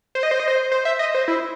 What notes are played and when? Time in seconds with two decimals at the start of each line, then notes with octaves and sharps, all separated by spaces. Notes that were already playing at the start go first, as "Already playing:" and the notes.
0.15 C5
0.23 D#5
0.31 C5
0.40 D#5
0.48 C5
0.72 C5
0.85 E5
0.99 D#5
1.14 C5
1.28 E4